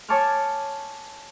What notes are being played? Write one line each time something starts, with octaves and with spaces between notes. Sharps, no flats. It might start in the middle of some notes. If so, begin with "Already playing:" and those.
C#5 G#5 A5 C#6 D6 F6